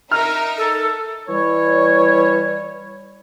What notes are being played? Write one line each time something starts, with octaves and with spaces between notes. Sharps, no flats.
D#4 A#4 E5 A#5 F6
A4
E3 G3 C#5